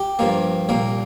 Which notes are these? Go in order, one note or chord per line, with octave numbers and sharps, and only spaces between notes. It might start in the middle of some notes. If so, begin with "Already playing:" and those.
Already playing: G4
G2 F3 A#3
C2 A#2 A#3